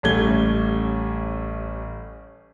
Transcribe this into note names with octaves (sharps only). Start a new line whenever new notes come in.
A1 G3 A3 C#4 G#6 G7